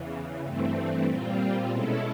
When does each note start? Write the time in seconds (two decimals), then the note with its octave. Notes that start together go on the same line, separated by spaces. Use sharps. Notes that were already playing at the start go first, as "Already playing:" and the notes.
Already playing: E2 C#3 E3
0.43 G2 E3 A3 C4
1.06 A#2 G3 C4 F4
1.69 B2 G#3 C#4 E4 A4